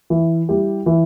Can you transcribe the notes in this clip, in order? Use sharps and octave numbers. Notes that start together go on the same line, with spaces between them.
E3
G3 E4 G4
E3